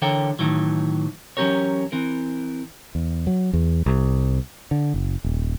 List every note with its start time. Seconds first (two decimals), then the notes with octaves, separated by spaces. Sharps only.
0.02 D3 E3 A4 A#4 C#5 G5
0.39 A2 D#3 E3 F#3
1.37 E3 F#3 C#4 G4 A#4 C#5
1.92 E3 C4 A#4
2.95 E2
3.27 F#3
3.53 E2
3.86 C2
4.71 D3
4.94 F#1
5.24 D#1